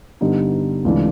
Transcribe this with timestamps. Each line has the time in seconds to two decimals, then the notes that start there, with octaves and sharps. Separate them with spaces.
0.21 G2 D3 G3 B3 D#4
0.84 C#2 C3 E3 A3 D4